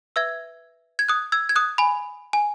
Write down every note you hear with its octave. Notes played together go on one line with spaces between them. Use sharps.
B4 E5 E6 G#6
G#6
D#6 F#6
E6 G#6
G#6
D#6 F#6
G#5 B5
G#5